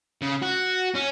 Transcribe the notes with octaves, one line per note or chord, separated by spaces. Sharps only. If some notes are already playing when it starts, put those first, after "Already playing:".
C#3
F#4
C#4